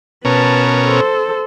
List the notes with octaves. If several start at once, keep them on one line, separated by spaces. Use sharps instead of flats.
B2 C#4 A#4 B4 A5
A4 C5